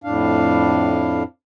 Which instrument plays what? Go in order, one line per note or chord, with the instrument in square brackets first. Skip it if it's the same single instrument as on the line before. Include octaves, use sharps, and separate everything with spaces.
[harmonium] F2 A2 D4 F5